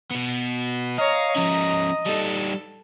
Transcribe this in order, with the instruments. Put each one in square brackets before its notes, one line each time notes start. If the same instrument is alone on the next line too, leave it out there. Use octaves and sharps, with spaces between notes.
[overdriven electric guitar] B2 B3
[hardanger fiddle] C#5 A#5 [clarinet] D#5 [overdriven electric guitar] F5
[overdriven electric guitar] F3 C#4 [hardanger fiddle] A#5
[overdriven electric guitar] G3 D#4 [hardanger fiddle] A4